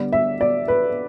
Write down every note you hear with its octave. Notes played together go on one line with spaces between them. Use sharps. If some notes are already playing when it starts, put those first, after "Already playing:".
Already playing: D3 G3 B3 D4 D5
E5
D5
B4